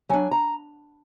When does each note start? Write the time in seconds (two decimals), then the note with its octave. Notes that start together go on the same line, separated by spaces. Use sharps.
0.09 F#3 D4 G#5
0.31 A#5